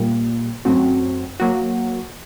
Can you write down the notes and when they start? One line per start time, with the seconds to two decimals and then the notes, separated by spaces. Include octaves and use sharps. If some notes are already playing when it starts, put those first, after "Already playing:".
Already playing: A#2 G3 A#3
0.65 F#2 F#3 A3 C4 F#4
1.40 F#3 A#3 F#4